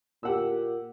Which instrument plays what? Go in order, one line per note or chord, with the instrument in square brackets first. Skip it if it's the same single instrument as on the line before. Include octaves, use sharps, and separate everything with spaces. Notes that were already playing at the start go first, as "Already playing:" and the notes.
[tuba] A#2 [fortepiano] G4 F#5 E6